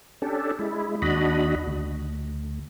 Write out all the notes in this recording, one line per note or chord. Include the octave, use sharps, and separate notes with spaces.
C#4 D4 G4 A4
G#3 E4
D#2 D4 F#4 D#5 B5
D2